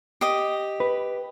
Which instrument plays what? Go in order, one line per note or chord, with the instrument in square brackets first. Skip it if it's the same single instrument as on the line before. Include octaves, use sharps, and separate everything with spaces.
[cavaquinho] G4 D#5
[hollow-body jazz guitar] B4